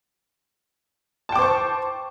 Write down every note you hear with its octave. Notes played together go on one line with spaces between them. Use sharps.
C5 G5 A5 C#6 D6